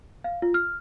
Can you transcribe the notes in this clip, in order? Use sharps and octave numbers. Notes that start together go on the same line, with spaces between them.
F5
F4
F6